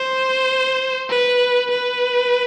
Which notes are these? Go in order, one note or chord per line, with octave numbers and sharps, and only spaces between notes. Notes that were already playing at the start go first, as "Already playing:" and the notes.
Already playing: C5
B4
B4